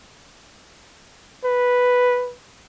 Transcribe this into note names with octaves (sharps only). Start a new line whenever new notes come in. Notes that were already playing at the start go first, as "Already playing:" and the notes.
B4